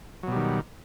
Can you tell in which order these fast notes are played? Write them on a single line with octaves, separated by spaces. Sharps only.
F#3 B2 G3 D#3